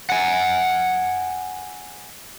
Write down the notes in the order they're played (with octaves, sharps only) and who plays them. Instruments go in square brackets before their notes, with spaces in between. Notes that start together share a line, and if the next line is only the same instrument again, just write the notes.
[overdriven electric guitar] F#5 G#5